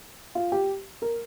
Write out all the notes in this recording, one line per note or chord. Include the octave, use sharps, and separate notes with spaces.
F4
G4
A#4